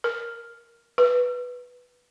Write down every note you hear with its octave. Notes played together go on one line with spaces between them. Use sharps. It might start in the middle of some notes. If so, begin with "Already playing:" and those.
A#4
B4